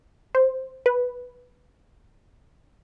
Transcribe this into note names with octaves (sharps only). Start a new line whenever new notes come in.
C5
B4